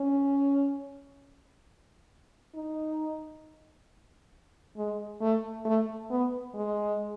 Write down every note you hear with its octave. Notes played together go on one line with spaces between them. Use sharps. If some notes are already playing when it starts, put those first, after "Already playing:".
Already playing: C#4
D#4
G#3
A3
A3
B3
G#3